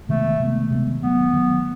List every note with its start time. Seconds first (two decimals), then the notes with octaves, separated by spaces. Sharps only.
0.09 C3 D#3 G#3 A3 B3
0.40 C3 D#3 G#3 B3
0.71 C3 D#3 G#3 B3
1.02 D#3 F#3 A3 B3
1.33 D#3 F#3 A3